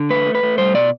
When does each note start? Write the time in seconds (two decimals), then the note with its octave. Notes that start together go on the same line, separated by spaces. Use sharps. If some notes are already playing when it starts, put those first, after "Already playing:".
Already playing: D3
0.10 A3 B4
0.26 A3
0.35 B4
0.43 A3
0.58 G3 C5
0.74 B2 D5